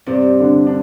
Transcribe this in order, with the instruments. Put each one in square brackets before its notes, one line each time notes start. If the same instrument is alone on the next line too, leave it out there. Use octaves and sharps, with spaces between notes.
[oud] G2 [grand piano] C3 C4
[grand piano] D3 D4
D4